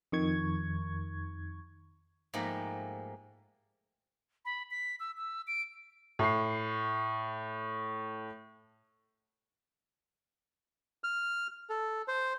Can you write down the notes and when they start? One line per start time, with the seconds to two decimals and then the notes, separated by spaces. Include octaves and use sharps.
0.12 F2 D#3 C#6 G#6
2.34 G#2 F3 A3 A#3 G4 B5
4.45 B5
4.71 B6
5.00 E6
5.17 E6
5.47 D7
6.19 A2 C7
11.04 F6
11.70 A4
12.08 C5